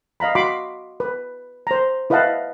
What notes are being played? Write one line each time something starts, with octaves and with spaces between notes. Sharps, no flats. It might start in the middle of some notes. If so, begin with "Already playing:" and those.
D#5 F5 A#5 B5
F#4 B5 C6 D6
B4
C5 A#5
E4 B4 D#5 F5 F#5 A5